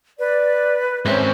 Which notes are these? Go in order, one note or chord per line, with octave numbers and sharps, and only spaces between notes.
B4 D5
G#2 C4 C#4 E5